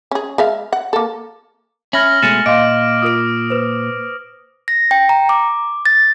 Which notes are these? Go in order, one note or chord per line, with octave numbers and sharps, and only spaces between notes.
C#4 G#4
G#3 E5 F5
F#5
A#3 A4
C#4 E5 B5 F6 G#6 A#6 F#7
B2 G#3 A3 G#5 A6 C#7
A#2 D#5 F5 C6 D6 D7
F4 A#4 D#6 D7
B4 C5
A#6
G5
A#5
D6
A6